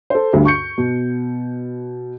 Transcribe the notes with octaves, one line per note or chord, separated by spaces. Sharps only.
A4 C5
D2 G2 D3
C#6 G6 C#7
B2